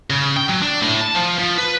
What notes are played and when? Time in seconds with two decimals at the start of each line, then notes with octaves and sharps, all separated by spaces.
0.10 C#3
0.37 G5
0.49 F#3
0.62 D4
0.81 A2
1.01 A5
1.15 F3
1.39 F3
1.58 B4